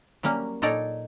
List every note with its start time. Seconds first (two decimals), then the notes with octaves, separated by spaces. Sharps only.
0.23 F#3 G3 A#3 C#4
0.62 A#2 D#4 A4 C#5 D5 A#5